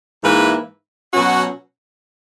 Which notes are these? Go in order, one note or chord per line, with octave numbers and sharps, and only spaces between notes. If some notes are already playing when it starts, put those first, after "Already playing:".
G#2 E3 A#3 E4 B4
B2 F#3 C#4 F#4